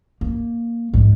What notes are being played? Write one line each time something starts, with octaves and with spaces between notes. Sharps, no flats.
A#3
G#2 G#3